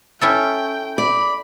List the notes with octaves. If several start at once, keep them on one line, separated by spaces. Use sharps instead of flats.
C#4 E4 A4 G5
D5 B5